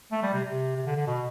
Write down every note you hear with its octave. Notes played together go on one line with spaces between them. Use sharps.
A3
G3
C3
C3
C3
D3
D3
B2